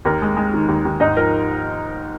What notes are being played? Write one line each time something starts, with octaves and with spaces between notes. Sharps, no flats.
D#2 A#4
G#3
G#3
D#3
D#2
D#2
G#2 D#4 D#5
F3 A#4